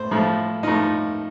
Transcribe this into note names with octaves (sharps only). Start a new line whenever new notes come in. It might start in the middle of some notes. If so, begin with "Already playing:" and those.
Already playing: A2 C5
A2 F3
A2 F3 D#4